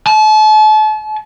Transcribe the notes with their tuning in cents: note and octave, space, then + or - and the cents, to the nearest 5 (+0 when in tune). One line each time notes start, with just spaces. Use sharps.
A5 -35